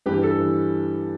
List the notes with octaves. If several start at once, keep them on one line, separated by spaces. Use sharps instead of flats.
G2 E3 G4 B4
A4
E3